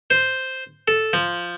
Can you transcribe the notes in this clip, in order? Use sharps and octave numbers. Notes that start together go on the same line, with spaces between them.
C5
A4
F3